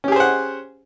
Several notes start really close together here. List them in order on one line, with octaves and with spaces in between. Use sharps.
C#4 G4 G#4 C5 F#5